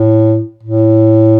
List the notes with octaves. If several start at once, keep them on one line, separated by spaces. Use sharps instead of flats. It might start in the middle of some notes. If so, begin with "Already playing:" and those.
Already playing: A2
A2